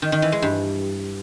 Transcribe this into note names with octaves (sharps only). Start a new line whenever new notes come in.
D#3
D#3
E3
G#3
G2